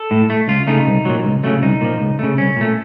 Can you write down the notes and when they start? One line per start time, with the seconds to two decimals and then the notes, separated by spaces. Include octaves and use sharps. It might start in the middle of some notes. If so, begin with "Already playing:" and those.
Already playing: A4
0.11 A2
0.30 A3
0.48 C#2 F4
0.67 C#3 A3 D#4
0.87 C2
1.05 A#2 F#3
1.25 C#2
1.44 C#3 F#3 A3
1.62 C2 D#4
1.81 A#2 F3
2.00 C#2
2.19 C#3 A3
2.38 C2 C#4
2.57 A#2 A3